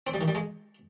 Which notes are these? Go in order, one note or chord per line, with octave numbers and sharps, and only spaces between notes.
C4
G3
D#3
G3
G#3